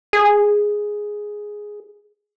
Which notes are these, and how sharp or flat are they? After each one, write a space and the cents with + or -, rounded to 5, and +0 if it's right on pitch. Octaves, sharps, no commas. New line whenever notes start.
G#4 +0